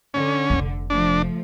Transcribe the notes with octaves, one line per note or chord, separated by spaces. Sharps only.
D3 C#4
F1 C3
F3 A3 D4